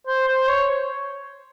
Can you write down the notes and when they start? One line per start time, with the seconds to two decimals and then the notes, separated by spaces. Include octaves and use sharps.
0.07 C5
0.28 C5
0.48 C#5